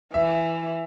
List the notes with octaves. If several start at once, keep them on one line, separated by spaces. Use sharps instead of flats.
E3 E5